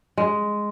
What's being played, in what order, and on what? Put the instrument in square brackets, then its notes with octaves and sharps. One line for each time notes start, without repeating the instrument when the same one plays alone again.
[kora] G#3